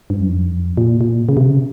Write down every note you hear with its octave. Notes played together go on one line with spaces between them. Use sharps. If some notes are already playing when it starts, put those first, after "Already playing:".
G2
F#2
F2
A#2
A#2
C#3
C3
C#3